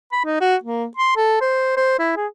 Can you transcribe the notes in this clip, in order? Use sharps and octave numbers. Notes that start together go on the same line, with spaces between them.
B5
D#4
F#4
A#3
C6
A4
C5
C5
E4
G#4